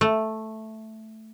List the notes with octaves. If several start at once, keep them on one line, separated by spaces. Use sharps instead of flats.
A3